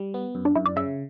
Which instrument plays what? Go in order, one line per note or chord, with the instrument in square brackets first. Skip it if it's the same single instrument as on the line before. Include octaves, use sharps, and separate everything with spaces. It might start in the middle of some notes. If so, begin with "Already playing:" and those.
Already playing: [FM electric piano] G3
B3
F#2
[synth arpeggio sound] D4
[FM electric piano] F#2 [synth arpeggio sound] E4
[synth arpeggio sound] D5
[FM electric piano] C#3 [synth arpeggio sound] E5